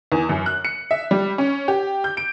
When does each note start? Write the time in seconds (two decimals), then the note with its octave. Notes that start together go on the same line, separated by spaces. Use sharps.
0.12 E2
0.29 F#2
0.46 F#6
0.65 C#7
0.91 E5
1.11 G3
1.38 C#4
1.68 G4
2.04 G6
2.17 D7